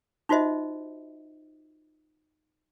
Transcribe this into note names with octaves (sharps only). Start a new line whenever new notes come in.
D#4 F4 F#4 C5 D#5 E5